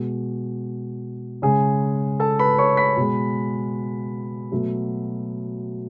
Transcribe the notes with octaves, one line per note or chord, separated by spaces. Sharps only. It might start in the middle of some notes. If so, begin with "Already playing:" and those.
Already playing: B2 G#3
C#3 G#3 G#4 G#5
A4 A5
B4 B5
C#5 C#6
B5 B6
B2 G#3
B2 F#3 A3